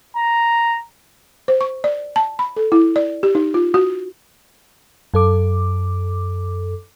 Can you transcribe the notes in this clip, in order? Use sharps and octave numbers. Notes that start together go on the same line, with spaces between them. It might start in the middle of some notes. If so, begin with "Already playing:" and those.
A#5
C5
C#6
D5
A5
B5
A4
E4
D5
G4
D#4
F4
F#4
F#2 A4 D6